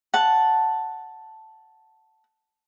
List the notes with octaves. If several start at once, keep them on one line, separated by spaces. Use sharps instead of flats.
F#5 A5